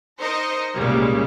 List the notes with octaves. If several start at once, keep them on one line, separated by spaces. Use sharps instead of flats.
D#4 A#4 C5 D#5 A#6 C#7
C2 A#2 C#3 G3 G#3 A#3